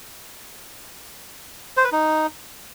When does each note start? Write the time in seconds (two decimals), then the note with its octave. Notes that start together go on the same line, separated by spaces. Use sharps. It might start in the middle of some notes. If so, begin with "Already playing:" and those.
1.77 C5
1.85 B4
1.92 D#4